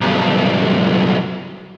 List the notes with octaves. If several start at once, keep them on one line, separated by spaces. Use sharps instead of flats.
B1 G2